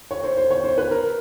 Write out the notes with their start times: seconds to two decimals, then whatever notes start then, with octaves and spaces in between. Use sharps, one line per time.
0.11 C#5
0.24 C5
0.37 C5
0.51 C#5
0.64 C5
0.78 B4
0.91 A#4